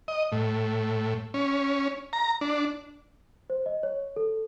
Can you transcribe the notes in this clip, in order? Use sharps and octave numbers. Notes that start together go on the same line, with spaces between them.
D#5
A2
C#4
A#5
D4
C5
D#5
C#5
A4